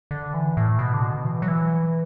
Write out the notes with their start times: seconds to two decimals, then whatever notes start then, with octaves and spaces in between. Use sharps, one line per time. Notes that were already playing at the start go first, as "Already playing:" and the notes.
0.11 D3
0.34 E3
0.57 A2
0.79 B2
0.94 D3
1.02 B2
1.25 E3
1.42 F#3
1.48 E3